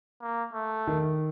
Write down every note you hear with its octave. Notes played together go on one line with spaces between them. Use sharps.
A#3
A3
D#3